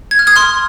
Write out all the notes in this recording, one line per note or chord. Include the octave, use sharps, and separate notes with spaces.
G#6
F6
D#6 G#6
C6 F6